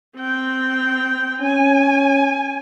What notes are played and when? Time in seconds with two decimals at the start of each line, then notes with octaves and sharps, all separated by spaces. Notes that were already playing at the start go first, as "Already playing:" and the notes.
0.17 C4 G5
1.41 C#4 G#5